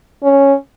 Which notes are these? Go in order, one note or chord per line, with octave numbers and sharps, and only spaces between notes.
C#4